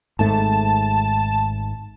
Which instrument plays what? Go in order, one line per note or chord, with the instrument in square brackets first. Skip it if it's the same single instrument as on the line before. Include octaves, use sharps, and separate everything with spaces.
[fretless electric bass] G#1 G#2 A3 [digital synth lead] A5